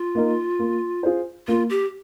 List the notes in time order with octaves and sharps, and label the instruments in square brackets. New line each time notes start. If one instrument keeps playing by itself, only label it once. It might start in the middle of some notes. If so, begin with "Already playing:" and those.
Already playing: [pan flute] F4
[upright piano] A#3 D#4 A#4
A#3
F4 G#4 C5
[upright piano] A#3 [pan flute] F4
[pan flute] G4